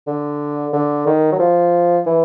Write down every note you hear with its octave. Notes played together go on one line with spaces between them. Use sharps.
D3
D3
D#3
F#3
F3
E3